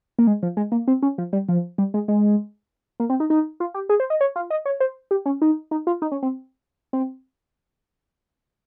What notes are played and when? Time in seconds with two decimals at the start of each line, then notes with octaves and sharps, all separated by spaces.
0.19 A#3
0.27 G#3
0.43 F3
0.57 G#3
0.72 A#3
0.88 C4
1.03 C#4
1.18 F3
1.33 G3
1.49 F3
1.78 G3
1.94 G#3
2.08 G#3
3.00 A#3
3.10 C4
3.20 D#4
3.30 D#4
3.60 F4
3.74 G4
3.89 G#4
4.00 C5
4.10 D#5
4.21 C#5
4.36 F4
4.50 D#5
4.66 C#5
4.80 C5
5.11 G4
5.26 C#4
5.42 D#4
5.71 D#4
5.87 F4
6.02 D#4
6.12 C#4
6.23 C4
6.93 C4